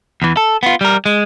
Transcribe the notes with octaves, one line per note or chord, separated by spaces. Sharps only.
E2 E3
A4
B3 F4
G3 A#4
G#3